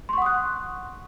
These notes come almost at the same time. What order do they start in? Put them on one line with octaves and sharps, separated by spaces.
C6 C#6 F#5 D#6 F#6